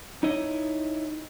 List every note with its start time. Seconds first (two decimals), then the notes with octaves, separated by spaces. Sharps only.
0.23 D#4 E4 C#5 D#5